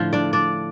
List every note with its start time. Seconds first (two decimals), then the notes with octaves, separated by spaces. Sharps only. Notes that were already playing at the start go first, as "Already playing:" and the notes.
Already playing: A2 D3 F3 A3 F4
0.13 D4 D5
0.33 D4 D5